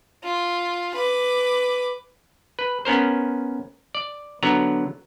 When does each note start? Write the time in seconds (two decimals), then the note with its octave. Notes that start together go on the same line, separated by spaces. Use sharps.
0.24 F4
0.95 B4 D6
2.59 B4
2.85 B3 C#4 A#4 C5
3.95 D5
4.43 D3 F#3 B3 C#5 A#5